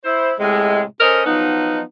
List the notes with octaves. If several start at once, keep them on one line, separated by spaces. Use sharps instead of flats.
E4 C5
A2 C3 G#3
C#4 A4 A#4 C5 D#5
F3 F#3 B3 D#4